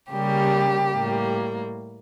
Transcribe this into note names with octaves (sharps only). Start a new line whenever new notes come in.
C#3 G3 A#3 G4
A2 G3 A#3